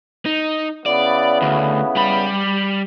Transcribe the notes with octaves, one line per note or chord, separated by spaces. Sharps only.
D#4
C#3 B3 E4 D5
D2
G3 B5